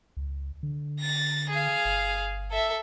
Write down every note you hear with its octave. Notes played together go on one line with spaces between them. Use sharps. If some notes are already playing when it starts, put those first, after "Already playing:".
C#2
D3
A6 A#6
G#4 F5
G1
A4 E5